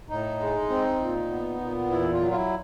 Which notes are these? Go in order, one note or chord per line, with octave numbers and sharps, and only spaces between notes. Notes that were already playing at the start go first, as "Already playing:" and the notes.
A2 D#4
G#3
C4
A#2
B3
A#2
E2 E4
F4
F#3
F4
E4